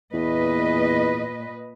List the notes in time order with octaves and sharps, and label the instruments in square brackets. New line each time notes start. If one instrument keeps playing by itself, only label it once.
[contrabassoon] E2 [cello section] A#2 B4 D#5